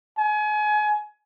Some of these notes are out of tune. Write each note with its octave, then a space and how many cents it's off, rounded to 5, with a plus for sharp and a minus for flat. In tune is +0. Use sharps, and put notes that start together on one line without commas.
G#5 +30